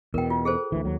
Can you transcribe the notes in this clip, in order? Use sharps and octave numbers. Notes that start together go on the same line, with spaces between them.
E2 B2 A#4 G5
F4
G#4 A4 C5
D2 E3
D#2 F#3